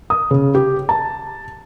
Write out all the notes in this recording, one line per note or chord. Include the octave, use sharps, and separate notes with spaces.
D#6
C#3
G4
A5